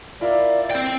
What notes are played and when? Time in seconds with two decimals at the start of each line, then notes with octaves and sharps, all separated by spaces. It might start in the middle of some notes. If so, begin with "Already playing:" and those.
0.21 E4 F4 A#4 D5
0.71 C4 G5